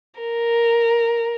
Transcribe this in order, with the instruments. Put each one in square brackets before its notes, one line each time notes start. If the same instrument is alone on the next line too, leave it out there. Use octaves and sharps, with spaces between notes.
[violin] A#4